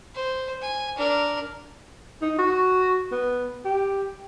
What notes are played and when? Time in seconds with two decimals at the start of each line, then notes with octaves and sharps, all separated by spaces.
0.15 C5
0.62 G#5
0.97 D4 A#4
2.22 D#4
2.39 F#4
3.12 B3
3.65 G4